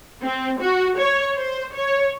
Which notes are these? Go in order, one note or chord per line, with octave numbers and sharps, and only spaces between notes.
C4
F#4
C#5
C5
C#5